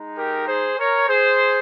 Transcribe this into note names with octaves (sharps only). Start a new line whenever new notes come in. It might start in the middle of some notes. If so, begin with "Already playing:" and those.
Already playing: G#3 D#4
G4 A#4
G#4 C5
A#4 C#5
G#4 C5